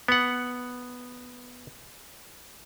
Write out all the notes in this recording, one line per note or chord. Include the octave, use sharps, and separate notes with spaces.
B3 F#5